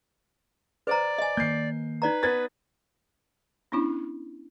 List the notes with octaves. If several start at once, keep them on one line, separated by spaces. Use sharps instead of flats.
B4 C5 D5 A#5
D#5 G#5
D#3 A#3 G6 C7
D#4 B4 D5 A#5
B3 G#6 A6
B3 C#4 D4 E4